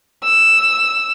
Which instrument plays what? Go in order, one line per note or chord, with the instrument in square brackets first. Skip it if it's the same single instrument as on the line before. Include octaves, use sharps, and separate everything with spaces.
[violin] E6